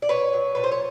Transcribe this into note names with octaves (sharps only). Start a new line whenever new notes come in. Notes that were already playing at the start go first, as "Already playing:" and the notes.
D5
A#2 B4 C#5
F#3
A#2 B4
C5
C#5